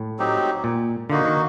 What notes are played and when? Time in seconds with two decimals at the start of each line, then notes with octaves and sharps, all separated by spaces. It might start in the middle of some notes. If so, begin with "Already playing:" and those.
Already playing: A2
0.19 F#3 C4 D#4 G4
0.64 A#2
1.10 D3 A#3 D#4 F#4
1.25 D#3